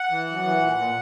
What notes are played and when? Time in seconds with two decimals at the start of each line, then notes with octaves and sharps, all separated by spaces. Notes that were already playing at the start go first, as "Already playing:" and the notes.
Already playing: F#5
0.10 E3
0.27 F#2
0.44 E3
0.61 A#2
0.78 A#2